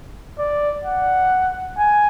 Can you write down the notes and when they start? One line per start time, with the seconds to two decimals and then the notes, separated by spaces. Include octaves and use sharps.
0.38 D5
0.85 F#5
1.78 G#5